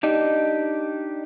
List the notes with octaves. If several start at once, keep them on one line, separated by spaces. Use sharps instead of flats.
D4 D#4 G4